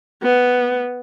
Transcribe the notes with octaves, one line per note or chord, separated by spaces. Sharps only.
B3